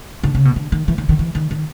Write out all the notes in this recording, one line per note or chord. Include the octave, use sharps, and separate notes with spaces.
D3
C#3
B2
D3
D#3
E3
D#3
D#3
E3
D#3
D#3